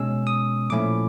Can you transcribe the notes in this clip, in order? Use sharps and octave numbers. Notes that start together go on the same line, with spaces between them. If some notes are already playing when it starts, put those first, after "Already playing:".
Already playing: B2 G#3 C#4 E6
D#6
A#2 F3 A3 C#4 E4 D6